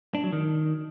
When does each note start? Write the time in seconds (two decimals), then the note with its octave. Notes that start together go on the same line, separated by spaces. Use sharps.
0.15 D4
0.24 F#3
0.33 D#3